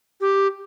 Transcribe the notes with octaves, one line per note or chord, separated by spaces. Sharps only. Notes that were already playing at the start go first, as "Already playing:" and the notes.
G4